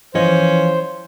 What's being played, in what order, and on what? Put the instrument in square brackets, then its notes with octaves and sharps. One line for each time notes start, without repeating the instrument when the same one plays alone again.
[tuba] E3 [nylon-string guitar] F3 D#5 [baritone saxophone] C#4 [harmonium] C5